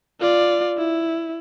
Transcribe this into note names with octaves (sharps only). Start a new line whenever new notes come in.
F4 D5
E4